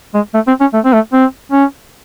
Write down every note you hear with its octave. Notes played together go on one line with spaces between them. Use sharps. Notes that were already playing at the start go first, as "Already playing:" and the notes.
G#3
A3
C4
C#4
A3
C4
A3
C4
C#4